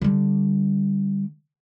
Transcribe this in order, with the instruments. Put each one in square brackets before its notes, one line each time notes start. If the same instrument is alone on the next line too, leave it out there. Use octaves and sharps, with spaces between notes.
[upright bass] D3 G3